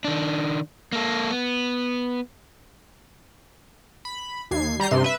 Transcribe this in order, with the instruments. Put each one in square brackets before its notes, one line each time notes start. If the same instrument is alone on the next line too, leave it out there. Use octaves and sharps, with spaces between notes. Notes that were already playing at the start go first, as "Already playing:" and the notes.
[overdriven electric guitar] D#3 D4
A#3 A4
B3
[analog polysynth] B5
D#2 G#6 C7
G3 A#5 G6 C7
G2 C3 C6
B4 E5